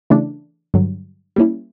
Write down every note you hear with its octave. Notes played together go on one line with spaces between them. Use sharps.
C#3 E3 A3 D4
G2 D3 F#3
G3 A#3 C#4 E4